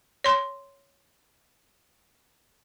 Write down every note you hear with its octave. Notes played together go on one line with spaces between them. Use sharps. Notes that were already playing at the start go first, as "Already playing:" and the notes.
C#5 C6